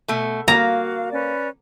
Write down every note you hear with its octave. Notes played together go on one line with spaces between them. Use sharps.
B2 A3
A#3 F#4 F5 A#5
C#4 B4 D5